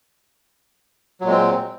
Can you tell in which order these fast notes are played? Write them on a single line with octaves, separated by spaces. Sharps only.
F#3 A#2 G#3 C4